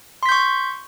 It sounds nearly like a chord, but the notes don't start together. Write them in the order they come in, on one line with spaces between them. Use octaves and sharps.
C6 B6 G6 C#6